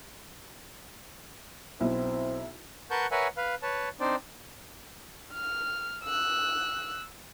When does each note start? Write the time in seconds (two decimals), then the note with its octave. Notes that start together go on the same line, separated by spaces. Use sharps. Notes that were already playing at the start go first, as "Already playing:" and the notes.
1.80 B1 C4 E4
2.90 A#4 B4 F#5 A5 C#6 G6
3.11 A#4 B4 C#5 E5 F#5 G#5
3.37 B4 F5
3.62 B4 C#5 A5
4.00 C4 D4 D#4 C5 D5
5.34 F6
6.04 E6 F#6